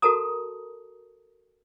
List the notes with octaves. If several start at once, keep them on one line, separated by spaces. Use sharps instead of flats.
F#4 A4 A#4 A5 A#5 D#6